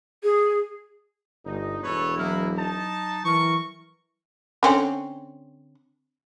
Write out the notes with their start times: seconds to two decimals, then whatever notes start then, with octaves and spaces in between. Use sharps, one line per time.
0.23 G#4
1.45 G1 D#4
1.83 E1 A4 B4 C#5
2.17 F#3 A#3 B3 E4 F6
2.57 D#4 A5
3.25 E3 A#4 C#6
4.63 D3 C4 C#4